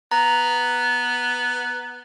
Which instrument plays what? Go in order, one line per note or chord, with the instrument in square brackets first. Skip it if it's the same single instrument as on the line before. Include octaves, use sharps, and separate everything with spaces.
[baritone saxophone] B3 [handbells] A#5